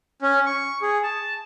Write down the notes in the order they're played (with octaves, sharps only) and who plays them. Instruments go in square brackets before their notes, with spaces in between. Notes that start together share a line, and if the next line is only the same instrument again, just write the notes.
[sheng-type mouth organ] C#4
C#6
G#4
A5